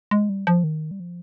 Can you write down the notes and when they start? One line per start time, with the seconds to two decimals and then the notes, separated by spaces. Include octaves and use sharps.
0.11 G#3
0.29 G3
0.47 F3
0.64 D#3
0.91 G3
1.00 F3